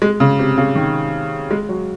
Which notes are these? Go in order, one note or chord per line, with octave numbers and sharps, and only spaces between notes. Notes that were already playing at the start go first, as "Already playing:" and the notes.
G#3
C#3
C3
C#3
D#3
G#3
F#3